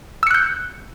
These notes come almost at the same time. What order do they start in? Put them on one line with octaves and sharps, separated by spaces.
E6 C#7 F#6 G6